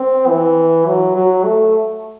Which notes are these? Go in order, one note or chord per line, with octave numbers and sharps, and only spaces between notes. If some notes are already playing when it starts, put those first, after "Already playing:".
Already playing: C4
E3
F#3
F#3
A3